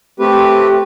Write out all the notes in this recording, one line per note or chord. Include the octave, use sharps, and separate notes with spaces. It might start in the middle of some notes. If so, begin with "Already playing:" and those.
A3 C4 G4 B4